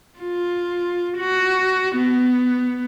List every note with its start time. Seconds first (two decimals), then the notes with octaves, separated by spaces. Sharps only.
0.20 F4
1.18 F#4
1.96 B3